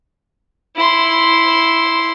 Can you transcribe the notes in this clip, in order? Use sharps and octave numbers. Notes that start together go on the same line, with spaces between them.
E4 C6